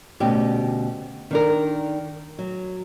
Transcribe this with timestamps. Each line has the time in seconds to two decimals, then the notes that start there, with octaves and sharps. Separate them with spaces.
0.20 D2 B2 C#4 G4
1.31 D#3 D4 A#4
2.39 F#3